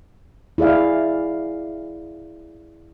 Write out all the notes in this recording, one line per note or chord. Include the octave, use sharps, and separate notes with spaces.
E4 G#4 D5 F5